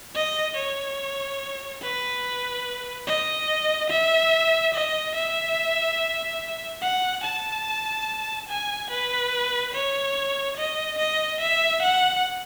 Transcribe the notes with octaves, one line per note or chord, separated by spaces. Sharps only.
D#5
C#5
B4
D#5
E5
D#5
E5
F#5
A5
G#5
B4
C#5
D#5
D#5
E5
F#5